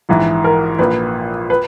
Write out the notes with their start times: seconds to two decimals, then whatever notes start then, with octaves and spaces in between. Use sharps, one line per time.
0.09 A#1 G#2 E3
0.44 A#4
0.78 A#1 A#2 B4
1.50 B4